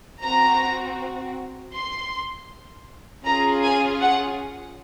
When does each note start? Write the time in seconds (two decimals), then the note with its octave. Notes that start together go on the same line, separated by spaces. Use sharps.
0.23 C4 F#4 A#5
1.74 C6
3.25 C#4 F4 G#4 A#5
3.63 G#5
4.01 F#5